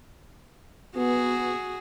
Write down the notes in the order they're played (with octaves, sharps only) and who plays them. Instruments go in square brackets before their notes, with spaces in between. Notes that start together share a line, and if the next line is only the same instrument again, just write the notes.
[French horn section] B3 [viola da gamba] F#4 G#4